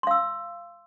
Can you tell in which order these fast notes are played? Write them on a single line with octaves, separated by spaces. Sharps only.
C6 F5 E6